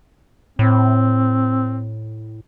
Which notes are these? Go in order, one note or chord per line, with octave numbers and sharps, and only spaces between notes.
A2 C4